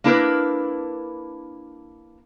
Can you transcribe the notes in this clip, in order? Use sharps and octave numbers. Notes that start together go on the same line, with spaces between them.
A#3 D4 E4 A#4 B4